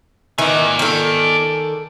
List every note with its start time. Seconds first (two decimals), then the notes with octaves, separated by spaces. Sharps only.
0.38 D#3 E3 B4 D5 G#5
0.79 D#3 A4